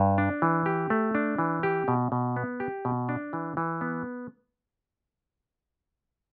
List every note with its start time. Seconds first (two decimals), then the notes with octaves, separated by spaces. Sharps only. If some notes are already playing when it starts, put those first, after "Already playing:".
Already playing: G2
0.18 D4
0.42 E3
0.66 G4
0.90 A3
1.15 D4
1.39 E3
1.63 G4
1.88 B2
2.12 B2
2.36 B3
2.60 G4
2.85 B2
3.09 D4
3.33 E3
3.57 E3
3.81 B3